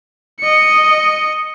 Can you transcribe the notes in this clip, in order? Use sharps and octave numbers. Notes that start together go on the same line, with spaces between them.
D#5 C#7